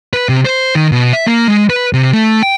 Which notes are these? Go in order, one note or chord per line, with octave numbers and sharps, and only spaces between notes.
B4
C3
C5
D#3
B2
E5
A#3
G#3
B4
C3
A3
G5